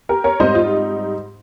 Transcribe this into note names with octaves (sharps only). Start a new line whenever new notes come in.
G4 A#4
A#4 C#5
G#2 G3 C4 D#4 C5 D#5
F4